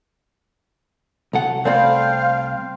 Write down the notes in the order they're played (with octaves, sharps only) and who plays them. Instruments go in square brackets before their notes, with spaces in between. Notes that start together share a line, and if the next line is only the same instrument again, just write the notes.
[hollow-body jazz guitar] C2 F#5 [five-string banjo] F#3 A4
[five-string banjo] A3 D5 B5 [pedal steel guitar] C4 C5 [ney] F5